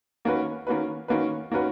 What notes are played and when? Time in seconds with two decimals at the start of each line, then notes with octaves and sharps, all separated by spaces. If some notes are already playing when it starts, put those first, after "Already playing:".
0.25 D#3 A#3 C#4 F#4 B4
0.67 D#3 A#3 C#4 F#4 B4
1.08 D#3 A#3 C#4 F#4 B4
1.51 D#3 A#3 C#4 F#4 B4